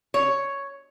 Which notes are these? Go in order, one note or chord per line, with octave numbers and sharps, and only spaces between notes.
C#5